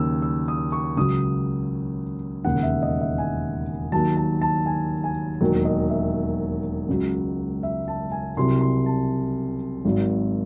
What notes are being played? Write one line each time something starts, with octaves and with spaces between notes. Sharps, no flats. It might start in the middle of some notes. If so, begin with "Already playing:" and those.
Already playing: D#2 C#3 F#3 E6
E6
D#6
C#6
C#2 C#3 F#3 D#6
E1 D#2 C#3 F#5
E5
D#5
E5
G#5
D#2 D#3 F#3 A5
A5
A5
G#5
G#5
E1 D#2 D#3 F#3
D#5
E5
C#2 C#3 F#3
E5
A5
G#5
C2 C3 F#3 C6
C6
A5
G#1 G#2 D#3 F#3